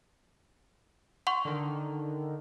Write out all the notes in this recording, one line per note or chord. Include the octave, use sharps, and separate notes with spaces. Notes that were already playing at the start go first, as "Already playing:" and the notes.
F#5 C6 C#6
D3 D#3